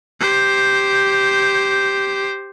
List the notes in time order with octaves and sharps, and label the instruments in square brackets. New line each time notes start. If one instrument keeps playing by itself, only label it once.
[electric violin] G4 C5